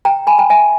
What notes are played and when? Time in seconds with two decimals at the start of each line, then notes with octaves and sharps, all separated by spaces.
0.05 G5 A#5
0.27 G#5 B5
0.38 G5 A#5
0.50 E5 G#5